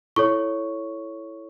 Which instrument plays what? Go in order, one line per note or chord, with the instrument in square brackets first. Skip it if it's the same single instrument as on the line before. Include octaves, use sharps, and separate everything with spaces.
[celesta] E4 A4 C#5 C#6